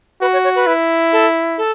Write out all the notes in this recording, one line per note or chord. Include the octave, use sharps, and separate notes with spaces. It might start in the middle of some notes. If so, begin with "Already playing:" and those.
F#4 B4
C#5
C#5
B4
E4
A4
A4